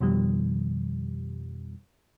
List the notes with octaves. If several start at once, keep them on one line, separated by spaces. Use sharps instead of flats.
F2 B2 D#3 F3 G3